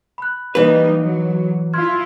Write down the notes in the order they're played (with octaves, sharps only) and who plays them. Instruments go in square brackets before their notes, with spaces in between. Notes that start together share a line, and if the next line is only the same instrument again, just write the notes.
[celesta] B5 F#6
[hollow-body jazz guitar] E3 B4 [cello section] G3 A#3 D#4
[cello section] F#3
[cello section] E4 F4 [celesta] C6 F6 G#6